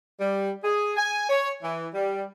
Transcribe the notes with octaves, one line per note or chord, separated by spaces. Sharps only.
G3
G#4
G#5
C#5
E3
G3